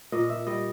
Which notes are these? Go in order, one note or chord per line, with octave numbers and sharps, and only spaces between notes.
A#2 D#5
E5
G3 D#5